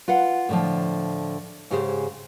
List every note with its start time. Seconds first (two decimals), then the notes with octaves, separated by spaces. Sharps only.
0.08 F4 B4 F5 F#5
0.49 A2 D3 F3
1.70 G#2 C#3 G4 G#4 B4 C5